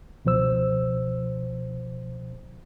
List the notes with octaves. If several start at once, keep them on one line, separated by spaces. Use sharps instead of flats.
C#2 B2 F3 C5 E6